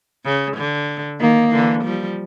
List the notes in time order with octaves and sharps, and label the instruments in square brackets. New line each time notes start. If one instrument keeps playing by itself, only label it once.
[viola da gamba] C#3
D3
[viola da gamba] D#3 [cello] A#3
[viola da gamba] D3 E3
F3 G3